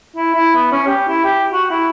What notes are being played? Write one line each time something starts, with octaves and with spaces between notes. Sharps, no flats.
E4
E4
B3
C#4
G4
E4
G4
F#4
E4